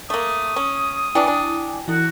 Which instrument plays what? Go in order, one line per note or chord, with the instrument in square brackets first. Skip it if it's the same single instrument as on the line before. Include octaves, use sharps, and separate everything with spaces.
[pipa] A3 A#3 [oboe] D#6
[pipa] C#4
[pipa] E3 D4 [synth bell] E4 G5 G#5
[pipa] D4
[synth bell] E3 E4 [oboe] F#4